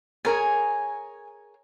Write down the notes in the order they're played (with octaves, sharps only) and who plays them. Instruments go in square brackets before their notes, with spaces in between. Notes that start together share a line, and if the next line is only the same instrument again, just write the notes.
[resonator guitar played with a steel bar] G#4 A#4 C#5 [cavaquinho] G#5